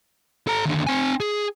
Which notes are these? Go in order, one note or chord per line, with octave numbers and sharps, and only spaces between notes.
A4 A#5
D#2 D3
C4 G#5
G#4